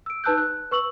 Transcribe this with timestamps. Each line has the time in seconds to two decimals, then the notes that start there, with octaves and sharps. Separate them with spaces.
0.06 E6 D7
0.24 D#4 B4 A5 E6 F#6 G6
0.38 B4 F#6
0.71 B4 C#6 E6 F#7